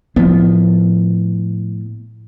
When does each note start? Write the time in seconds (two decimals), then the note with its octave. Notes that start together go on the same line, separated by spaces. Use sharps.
0.16 A2 F3 B3